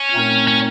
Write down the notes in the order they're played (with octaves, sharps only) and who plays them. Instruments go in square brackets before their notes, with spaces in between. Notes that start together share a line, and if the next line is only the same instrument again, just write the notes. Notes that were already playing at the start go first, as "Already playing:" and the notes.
Already playing: [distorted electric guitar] C#4
[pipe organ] A#2 A3 C4 D#4 A#4
[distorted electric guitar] C#4